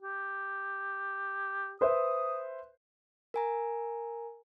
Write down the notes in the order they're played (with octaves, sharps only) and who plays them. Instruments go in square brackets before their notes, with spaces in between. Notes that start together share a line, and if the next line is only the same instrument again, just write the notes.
[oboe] G4
[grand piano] B4 C5 E5 [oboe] D#6
[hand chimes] A#4 G#5 A#5